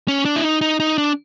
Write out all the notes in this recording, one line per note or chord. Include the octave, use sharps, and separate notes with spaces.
C#4
D4
E4
D#4
D#4
D#4
D4